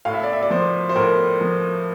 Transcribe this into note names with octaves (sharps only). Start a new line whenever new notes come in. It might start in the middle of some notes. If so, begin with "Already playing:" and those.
A2 F5
E5
D5
E5
D5
F3 C5
C5
A2 A#4
F3